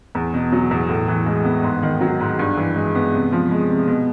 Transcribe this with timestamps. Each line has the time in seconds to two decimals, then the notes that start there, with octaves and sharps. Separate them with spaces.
0.15 E2
0.34 B2
0.52 F#3
0.71 E2
0.89 A2
1.08 E3
1.26 G#3
1.45 B3
1.63 G#2
1.83 D#3
2.01 F#3
2.21 G#2
2.39 G2
2.58 E3
2.76 G#3
2.95 B3
3.14 C3
3.32 F3
3.51 G#3
3.70 C3
3.87 B2